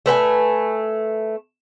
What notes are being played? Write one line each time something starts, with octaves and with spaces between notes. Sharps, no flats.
A3 B4 G5 G#5